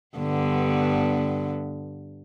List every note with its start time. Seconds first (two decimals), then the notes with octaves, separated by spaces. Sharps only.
0.17 G2 D3 B3